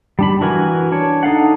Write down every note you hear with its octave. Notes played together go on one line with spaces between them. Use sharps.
G3 D4 B5
E3 F#4 A#4 G#5
D4 C#5
D#4 A4 F5 F#5